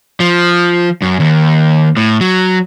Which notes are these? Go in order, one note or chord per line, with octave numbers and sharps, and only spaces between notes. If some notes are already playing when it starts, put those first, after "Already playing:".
F3
F#2
D#2
A2
F#3